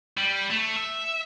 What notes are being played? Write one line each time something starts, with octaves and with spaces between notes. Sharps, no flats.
G3
A3
E5